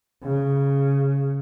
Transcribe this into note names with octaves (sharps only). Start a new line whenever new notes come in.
C#3